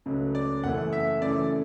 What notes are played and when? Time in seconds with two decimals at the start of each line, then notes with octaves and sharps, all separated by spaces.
0.06 C#2 C#3 F#3 A3
0.35 D5
0.64 F#1 F#2 E3 A3 F#5
0.93 E5
1.22 F#2 C#3 E3 A3 D5